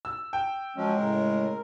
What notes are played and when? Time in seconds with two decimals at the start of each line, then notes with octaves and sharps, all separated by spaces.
0.05 E6
0.33 G5
0.76 F3 F#3 G#3 C#4
0.97 A2 C#3 A#4